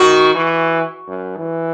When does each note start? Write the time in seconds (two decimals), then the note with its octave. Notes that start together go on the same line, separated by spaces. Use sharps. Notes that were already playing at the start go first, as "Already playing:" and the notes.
Already playing: D#3 F#4
0.34 E3
1.07 F#2
1.37 E3